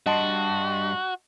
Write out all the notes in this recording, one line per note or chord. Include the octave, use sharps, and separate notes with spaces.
G2 F#4 D#5 A5 C6